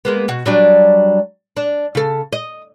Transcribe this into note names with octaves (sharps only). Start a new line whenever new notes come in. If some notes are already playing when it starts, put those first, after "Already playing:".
G#3 A#3 B3
B2 F#4
F#3 G3 D4
D4
C#3 A4
D#5